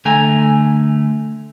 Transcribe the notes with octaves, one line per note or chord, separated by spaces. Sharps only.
D3 A3 G#5 A#5